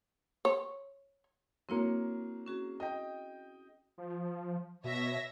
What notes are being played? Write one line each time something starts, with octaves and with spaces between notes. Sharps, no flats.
C#5
F#3 A#3 C4 E4 C#5
C#4 F#4 G#4
D#5 G5
F3
B2 C#5 E5 A#6